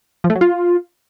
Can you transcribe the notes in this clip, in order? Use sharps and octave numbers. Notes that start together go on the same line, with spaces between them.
F3
A3
F#3
F4